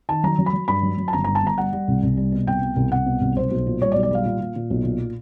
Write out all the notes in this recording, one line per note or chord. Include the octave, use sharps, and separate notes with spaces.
D#3 A5
F#3 A#5
F#3
B5
F#3
G2 B5
F#3
F#3
A5
G1 A#5
G2 A#5
A5
G1 A#5
G3 F#5
G3
C2
C2
G3
B2
C2 G5
B2
C2
C2 F#5
B2
C2
B1 C5
B1
A#2
G3 C#5
D5
B1
D5
G3 F5
A#2
A#2
A#2
B1
A#2